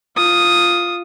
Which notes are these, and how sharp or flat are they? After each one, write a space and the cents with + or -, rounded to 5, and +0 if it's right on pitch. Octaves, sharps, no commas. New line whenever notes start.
F4 +0 D#6 +0